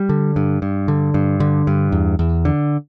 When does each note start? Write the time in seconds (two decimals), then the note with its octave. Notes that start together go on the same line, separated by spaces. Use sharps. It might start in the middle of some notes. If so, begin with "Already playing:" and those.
Already playing: G3
0.09 D3
0.36 G2
0.62 G2
0.88 D3
1.14 G2
1.40 D3
1.67 G2
1.92 E2
2.19 E2
2.45 D3